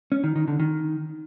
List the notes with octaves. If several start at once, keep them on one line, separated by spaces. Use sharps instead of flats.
C#4
D#3
D#3
D3
D#3